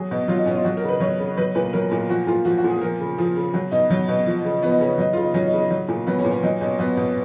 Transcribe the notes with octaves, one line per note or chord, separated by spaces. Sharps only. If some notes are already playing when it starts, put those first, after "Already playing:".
Already playing: F#3 G#4
B2
F#3 F4
D#4
B2 C#4
F4
F#3 F#4
A#4
C#3
B4
F#3 C#5
C#3
F#3 B4
A#2 B4
F#3 A#4
A#2
F3 F#4
A#2 F4
F3 F#4
F#4
A#2
G#4
F3 A#4
C#3
F3 G#4
C#3
F#3 F#4
B2 D#4
F#3
B2
F3
C#3
F3 B3
D#4
C#3 C#4
F#3 D#4
C#3 F4
D#4
F#3 C#4
D#4
C#3
D#4
F#3 D#4
A#2
F#3 B3
C#4
A#2
C#4
F#3 D#4
B2 C#4
F#3 B3
B2